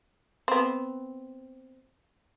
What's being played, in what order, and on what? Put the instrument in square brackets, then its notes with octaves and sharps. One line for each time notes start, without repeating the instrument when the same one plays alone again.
[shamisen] B3 C4